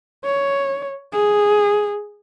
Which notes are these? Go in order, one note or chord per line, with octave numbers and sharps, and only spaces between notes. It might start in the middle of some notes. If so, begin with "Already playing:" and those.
C#5
G#4